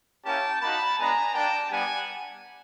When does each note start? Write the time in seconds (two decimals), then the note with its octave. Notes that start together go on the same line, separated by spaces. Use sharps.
0.25 A#3 C#4 E4 G4 G5 A5
0.61 A#3 D#4 F#4 A5 B5
0.98 G#3 B3 D4 G#5 A#5
1.34 A#3 D4 G4 G5 A5
1.71 G3 B3 D4 G4 F#5 G#5